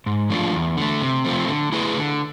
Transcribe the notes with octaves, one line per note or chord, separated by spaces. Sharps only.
G#2
F3 A3 D4 F4
E2
D3 A3
C3
F3 A3 C4
D3
A3 E4 G#4 B4
D3